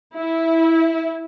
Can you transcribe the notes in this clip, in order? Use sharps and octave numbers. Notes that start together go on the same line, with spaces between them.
E4